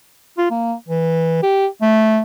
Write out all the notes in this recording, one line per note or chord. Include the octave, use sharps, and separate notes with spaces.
F4
A#3
E3
G4
A3